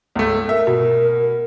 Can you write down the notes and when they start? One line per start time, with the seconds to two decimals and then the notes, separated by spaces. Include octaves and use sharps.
0.16 C#2 A3
0.49 A#4 E5
0.67 B2